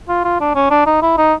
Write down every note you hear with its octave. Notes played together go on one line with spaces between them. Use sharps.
F4
F4
D4
C#4
D4
D#4
E4
D#4